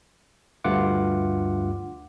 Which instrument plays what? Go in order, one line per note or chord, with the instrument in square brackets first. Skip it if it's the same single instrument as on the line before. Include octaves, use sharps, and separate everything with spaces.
[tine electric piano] D2 G2 A3 F4 F#5 D6